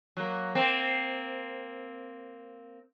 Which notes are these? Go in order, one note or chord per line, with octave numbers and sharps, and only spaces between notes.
F#3 A#3
A#3 C4